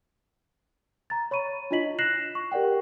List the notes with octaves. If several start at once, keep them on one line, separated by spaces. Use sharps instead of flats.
A#5 A6
C#5 B5 C#6 D#7
D4 E4 F4 D#5 B6 F#7
F#6 A#6 C7 E7 F#7
C#6
G4 A#4 D5 F#5 G5